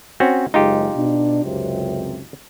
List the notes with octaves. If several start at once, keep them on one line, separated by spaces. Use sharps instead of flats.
C4 C#4 F#4
F#1 G#3 D#4 F4 G4
B2 D4
C#2 F#2 C3